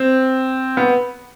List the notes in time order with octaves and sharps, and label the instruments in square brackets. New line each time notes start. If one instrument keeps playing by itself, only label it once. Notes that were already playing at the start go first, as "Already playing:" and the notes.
Already playing: [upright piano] C4
B3